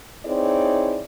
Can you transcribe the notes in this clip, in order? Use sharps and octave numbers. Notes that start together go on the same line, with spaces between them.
C4 D#4 E4 G#4 C#5 D5